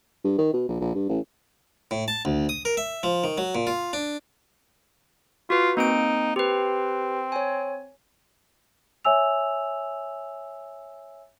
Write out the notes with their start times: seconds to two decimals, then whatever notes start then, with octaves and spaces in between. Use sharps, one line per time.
0.24 G2
0.38 D#3
0.53 B2
0.69 A#1
0.81 A#1
0.95 G2
1.09 A1
1.91 A2
2.08 A5
2.25 D2
2.49 D#6
2.65 A#4
2.77 E5
3.03 F3
3.24 D#3
3.38 F#3
3.55 A#2
3.67 F4
3.93 D4
5.50 F4 F#4 B4
5.77 A#3 C4 D#4 D7
6.36 C4 G4 B4
7.32 C#5 G#5
9.05 C#5 E5 G#5 E6 F7